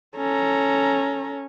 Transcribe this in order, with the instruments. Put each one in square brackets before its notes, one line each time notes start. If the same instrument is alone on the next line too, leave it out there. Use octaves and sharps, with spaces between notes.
[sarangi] C#4 [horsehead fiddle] A4 A#5